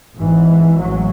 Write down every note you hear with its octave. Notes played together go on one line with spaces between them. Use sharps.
G#1 G#2 E3
A1 G#2 F#3